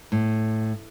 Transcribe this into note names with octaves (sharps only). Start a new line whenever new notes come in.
A2